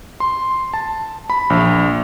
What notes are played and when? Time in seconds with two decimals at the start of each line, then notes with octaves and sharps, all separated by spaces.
0.20 C6
0.74 A5
1.30 B5
1.50 A#1